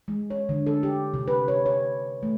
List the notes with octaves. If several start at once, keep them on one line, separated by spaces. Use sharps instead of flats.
G#3
C#5
D3
A4
G4
C3
B4
C#5
C#5
A3